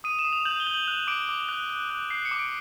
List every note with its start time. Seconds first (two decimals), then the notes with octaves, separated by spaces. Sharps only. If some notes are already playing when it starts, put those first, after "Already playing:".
0.04 D#6 D#7
0.19 E7
0.25 D#6
0.33 F7
0.45 G6 F#7
0.60 G7
0.67 G6
0.74 F#7
0.88 F#6
1.07 D6 D7
1.29 D6
1.49 F#6
1.69 F#6
1.90 F#6
2.10 F#6 C7
2.25 C#7
2.31 D6
2.39 D7